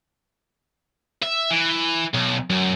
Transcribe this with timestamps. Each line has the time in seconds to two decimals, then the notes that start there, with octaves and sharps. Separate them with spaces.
1.22 E5
1.50 E3
2.14 B1
2.50 F#2